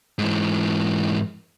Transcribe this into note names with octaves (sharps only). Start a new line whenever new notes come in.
G#2 E3